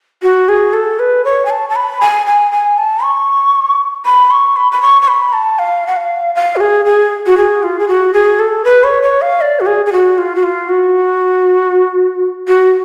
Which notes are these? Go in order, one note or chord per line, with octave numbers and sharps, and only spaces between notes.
F#4
G#4
A4
B4
C#5
G#5
A5
A5
B5
G#5
G#5
G#5
A5
C#6
B5
C#6
B5
B5
C#6
C#6
B5
A5
F5
F#5
F5
F5
F#4
G#4
G#4
F#4
G#4
F4
G#4
F#4
G#4
A4
B4
C#5
C#5
F5
D5
F#4
G#4
G#4
F#4
F4
F#4
F4
F#4
F#4